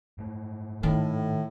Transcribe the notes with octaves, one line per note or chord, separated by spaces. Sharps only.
G#2 A3
A2 D#3